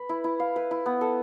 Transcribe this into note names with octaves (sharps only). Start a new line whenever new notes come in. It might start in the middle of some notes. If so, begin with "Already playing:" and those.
Already playing: B4
E4
E4
F5
B4
E4
B3
A4